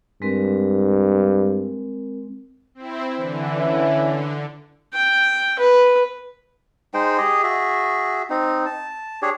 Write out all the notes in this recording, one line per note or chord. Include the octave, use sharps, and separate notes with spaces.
G2 G#3 C4 A#4
C4 E4
D3 E3
C#4 D4 E4
D3
G5
B4
G#3 D#4 C5 G5
G4 G#4 D#5
F#4 G#4 E5
C4 D#4
A5
D4 G4 G#4 C#5